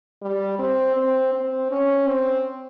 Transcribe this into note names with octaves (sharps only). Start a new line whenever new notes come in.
G3
C4
C4
C4
C#4
C4